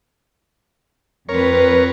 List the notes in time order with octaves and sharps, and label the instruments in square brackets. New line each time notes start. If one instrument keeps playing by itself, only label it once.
[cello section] F2 C4 B4 [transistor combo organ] A#4 C#5